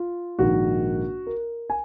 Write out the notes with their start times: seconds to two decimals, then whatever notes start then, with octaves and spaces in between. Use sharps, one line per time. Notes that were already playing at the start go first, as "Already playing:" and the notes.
Already playing: F4
0.39 A#1 G#2 D#3 A#3 F#4
1.27 A#4
1.70 G#5